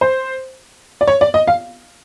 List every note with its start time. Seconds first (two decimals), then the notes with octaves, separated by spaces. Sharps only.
0.01 C5
1.01 D5
1.07 C#5
1.21 D5
1.34 D#5
1.47 F5